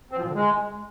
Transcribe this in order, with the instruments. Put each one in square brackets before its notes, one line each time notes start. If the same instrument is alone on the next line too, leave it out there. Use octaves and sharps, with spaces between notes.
[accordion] C4
F3
A#2
D3
G#3